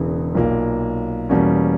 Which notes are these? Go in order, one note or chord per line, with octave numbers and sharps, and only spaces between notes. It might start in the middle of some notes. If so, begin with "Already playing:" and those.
Already playing: E1 E2 C#3 E3
B1 A#2 A#3
E2 B2 G3 A#3 C#4